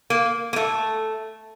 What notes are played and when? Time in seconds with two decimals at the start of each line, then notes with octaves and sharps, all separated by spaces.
0.10 A#3
0.53 A#3
0.56 A3